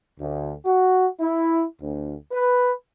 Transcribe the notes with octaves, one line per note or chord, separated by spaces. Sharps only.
D2
F#4
E4
D2
B4